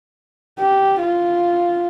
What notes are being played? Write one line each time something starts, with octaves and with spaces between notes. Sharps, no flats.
G4
F4